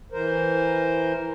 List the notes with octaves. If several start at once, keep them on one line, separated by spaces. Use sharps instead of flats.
E3 A#4 C5